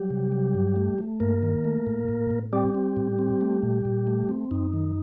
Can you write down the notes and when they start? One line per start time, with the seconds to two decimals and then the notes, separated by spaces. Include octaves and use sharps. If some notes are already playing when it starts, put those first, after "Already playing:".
Already playing: F#3 G3 G4
0.10 C3
0.32 F#3
0.54 G2
0.76 A3
0.98 A3
1.20 G2 A#3 A#4
1.43 D#3
1.65 A3
1.87 A2
2.08 A2
2.31 A2
2.53 G3 C4 G4
2.75 C4
2.97 A2
3.19 C4
3.41 A3
3.63 A#2
3.85 A#2
4.07 A3
4.29 C4
4.51 F#2 D#4
4.73 D#3